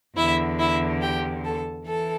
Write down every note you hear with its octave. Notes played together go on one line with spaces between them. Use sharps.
E2 D3 E4 E5
E4 E5
G4 G5
A4 A5
E3 A4 A5